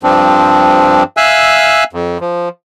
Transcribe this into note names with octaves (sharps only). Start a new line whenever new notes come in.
G2 F3 C4 D4
E5 F5 G#5 E6 F#6
F2
F3